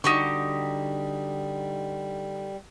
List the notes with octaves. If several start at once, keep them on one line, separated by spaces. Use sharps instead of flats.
D3 G3 D#4 F#4 G4 C#6